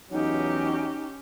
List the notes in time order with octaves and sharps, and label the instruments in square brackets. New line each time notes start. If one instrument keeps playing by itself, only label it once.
[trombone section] E2 F#3 [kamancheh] C#4 G4 [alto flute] D#4